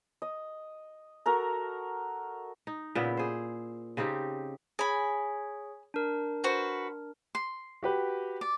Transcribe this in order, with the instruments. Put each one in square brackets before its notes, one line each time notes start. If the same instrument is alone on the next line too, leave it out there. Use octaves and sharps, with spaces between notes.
[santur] D#5
F#4 A4 A#4 A#5
[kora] D#4
A#2 C#3 B3 E4
G#4 C5
C#3 C4 D#4 G4
[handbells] G#4 C#5 [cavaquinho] G#5 B5
[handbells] D4 A#4
[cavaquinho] F#4 B4 C5
C6
[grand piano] F#4 G4 B4
[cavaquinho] D5